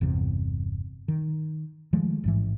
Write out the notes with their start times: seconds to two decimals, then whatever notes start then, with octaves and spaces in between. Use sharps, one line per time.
0.01 G1 E2 C3
1.08 D#3
1.93 D#3 F3 G#3 A3
2.24 A1 G#2 E3